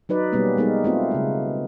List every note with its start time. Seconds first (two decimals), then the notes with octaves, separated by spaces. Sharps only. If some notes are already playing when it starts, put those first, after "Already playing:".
0.09 F#3 D#4 B4 D5
0.32 B2 G3 A#3 B3 C#4
0.57 G3 G#3 B3 D#4 A#4
0.84 A3 C4 F4
1.11 C#3 G#3